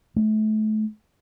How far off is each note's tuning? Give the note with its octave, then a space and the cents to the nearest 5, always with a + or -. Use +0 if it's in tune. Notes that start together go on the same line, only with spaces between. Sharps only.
A3 -30